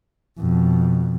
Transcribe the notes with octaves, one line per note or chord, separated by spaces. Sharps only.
F2 B2